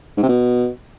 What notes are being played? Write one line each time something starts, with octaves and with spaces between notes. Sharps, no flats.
G#2
C3
B2